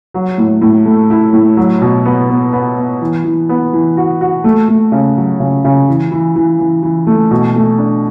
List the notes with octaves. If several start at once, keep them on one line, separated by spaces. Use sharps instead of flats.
F#3
A2
A2
A3
E4
A2
F#3
B2
B3
B3
B3
B3
E3
E3
B3
E3
F#4
F#4
A3
A3
C#3
F#3
C#3
C#3
E3
E3
E3
E3
E3
A3
B2
A3
D4